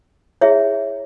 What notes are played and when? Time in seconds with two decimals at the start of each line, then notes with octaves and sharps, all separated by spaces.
0.41 E4 G#4 C#5 E5